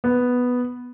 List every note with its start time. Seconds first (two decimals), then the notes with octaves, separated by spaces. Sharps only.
0.04 B3